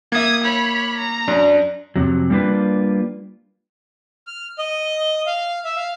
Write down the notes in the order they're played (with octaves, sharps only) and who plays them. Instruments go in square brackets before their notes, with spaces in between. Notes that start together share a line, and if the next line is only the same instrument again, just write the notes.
[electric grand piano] A#3 E5 [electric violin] D#6 G#6
[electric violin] C#5 B5
A#5
[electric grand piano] F#2 [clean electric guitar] D4
[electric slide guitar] F2 G#2 C3 F#3
G3 A#3 D4 F4 B4
[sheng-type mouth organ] F6
D#5
F5
E5
F5